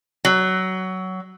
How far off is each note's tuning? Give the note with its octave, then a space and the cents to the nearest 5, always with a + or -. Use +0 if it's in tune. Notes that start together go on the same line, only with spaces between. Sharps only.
F#3 +15